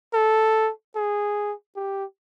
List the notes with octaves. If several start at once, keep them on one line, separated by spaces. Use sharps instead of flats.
A4
G#4
G4